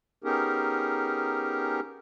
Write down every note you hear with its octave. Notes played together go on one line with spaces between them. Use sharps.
B3 C#4 D#4 G4 G#4 A#4